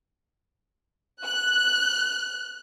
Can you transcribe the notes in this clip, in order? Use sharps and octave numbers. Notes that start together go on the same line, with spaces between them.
F#6